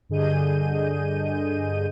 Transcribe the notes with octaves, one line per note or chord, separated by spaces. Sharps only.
G2 D3 G#4 D#5 G6 D#7